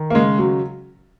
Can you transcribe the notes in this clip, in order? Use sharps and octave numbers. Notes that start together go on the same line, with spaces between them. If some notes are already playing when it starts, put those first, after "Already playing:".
Already playing: D#3
A#3
C#3 G#3
F#3